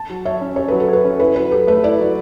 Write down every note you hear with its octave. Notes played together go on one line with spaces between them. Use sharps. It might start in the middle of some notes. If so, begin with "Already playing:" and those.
Already playing: A5
F#3
C#5 E5
C#4
G4 C#5
F#3 B4
A4
C#5
B4
C#4
E4 B4
F#3 B4
G4 A4
A3 B4
E4 D5
F#3